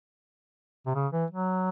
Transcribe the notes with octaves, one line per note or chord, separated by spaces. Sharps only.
C3
C#3
E3
F#3